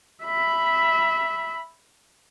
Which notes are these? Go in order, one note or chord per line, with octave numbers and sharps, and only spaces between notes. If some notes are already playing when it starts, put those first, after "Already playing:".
E5 B5